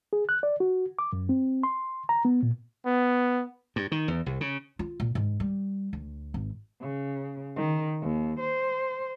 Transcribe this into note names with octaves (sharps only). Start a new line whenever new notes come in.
G#4
F#6
D5
F#4
D6
F#2
C4
C6
A#5
B3
A#2
B3
G2
D#3
E2
C2
C#3
F4
A#2
G#2
G3
D2
G#1
C#3
D#3
D#2
C5